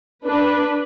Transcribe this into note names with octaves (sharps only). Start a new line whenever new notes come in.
D4 B4